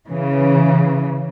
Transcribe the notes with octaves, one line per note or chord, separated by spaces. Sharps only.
C#3 E3